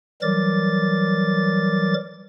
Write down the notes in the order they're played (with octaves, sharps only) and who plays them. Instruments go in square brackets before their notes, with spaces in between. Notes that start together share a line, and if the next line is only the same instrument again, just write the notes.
[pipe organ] E3 F#3 G3 A#4 D6 A6